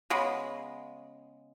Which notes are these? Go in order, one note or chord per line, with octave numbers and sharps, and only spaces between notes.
C#3 G#3 B3